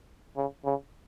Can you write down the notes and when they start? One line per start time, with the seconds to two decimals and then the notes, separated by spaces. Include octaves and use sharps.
0.37 C#3
0.65 C#3